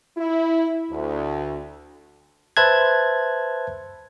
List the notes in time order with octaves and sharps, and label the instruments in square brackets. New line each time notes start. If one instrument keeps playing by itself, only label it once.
[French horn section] E4
D2
[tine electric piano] B4 C5 E5 A5 F#6 G#6